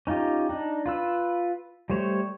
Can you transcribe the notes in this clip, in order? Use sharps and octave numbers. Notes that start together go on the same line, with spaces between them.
C#4 D#4 F4 G4
D4 D#4
F4 B4 E6
G3 A3 C5 C#5